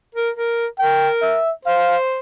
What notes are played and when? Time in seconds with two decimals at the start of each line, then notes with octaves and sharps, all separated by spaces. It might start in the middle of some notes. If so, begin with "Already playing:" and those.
0.15 A#4
0.36 A#4
0.79 A#4 G5
1.22 E5
1.65 C5 F5